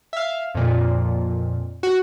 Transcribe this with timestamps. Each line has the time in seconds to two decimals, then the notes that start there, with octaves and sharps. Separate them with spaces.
0.13 E5 F5
0.55 F2 A#2
1.83 F#4